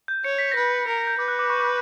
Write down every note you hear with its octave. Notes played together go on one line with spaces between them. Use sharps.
G6
C#5 C#7
B6
B4 A#6
B6
A#4 A#6
A#6
G6
B4 D6
F#6
D6
C#6
D6